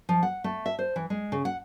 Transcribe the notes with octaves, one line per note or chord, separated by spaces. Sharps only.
F3
F#5
A3
E5
C5
E3
G#3
C#3
F#5